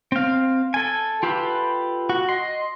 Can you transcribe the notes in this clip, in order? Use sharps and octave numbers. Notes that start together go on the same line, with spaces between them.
C4 F5
A4 G#5
F4 G4 A4 B4
F#4
D#5 C6